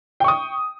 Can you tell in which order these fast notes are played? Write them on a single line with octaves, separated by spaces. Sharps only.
G5 C#6 D#6